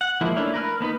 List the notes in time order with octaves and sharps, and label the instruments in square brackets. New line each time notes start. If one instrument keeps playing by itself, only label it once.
[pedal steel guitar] F#5
F3 G#3 A#3 E4
A3 A#3 C#4 D4 E4
A#4 B4 F6
A#3 B3 D#4 B4